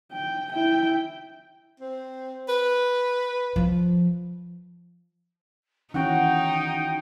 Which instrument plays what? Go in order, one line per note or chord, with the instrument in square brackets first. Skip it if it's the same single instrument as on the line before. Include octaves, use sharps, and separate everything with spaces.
[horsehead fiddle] G5
E4 G5
[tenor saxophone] C4
B4
[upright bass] F3
[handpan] D#3 E3 C#4 [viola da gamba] D#4 [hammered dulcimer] F#4 F#5 [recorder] G5